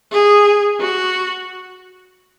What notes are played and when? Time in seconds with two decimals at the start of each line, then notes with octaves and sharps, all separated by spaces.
0.12 G#4
0.80 F#4